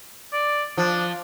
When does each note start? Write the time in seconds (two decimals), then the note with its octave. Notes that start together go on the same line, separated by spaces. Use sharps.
0.33 D5
0.78 F3 D4